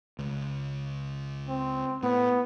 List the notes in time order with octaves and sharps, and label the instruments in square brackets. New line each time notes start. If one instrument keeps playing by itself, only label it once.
[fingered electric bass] C#2
[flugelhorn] C4
[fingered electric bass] A2 [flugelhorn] B3